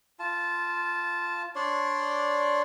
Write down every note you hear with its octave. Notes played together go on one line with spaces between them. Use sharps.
F4 A5
D4 C#5 D5 C6